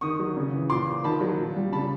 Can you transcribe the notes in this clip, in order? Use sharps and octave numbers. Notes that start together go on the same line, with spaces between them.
D#3 C#6 D#6
F#3
C#3
E3
A#2 C6 D6
F3
D#3 A5 B5
F#3
A#2
G3
C#3 A5 B5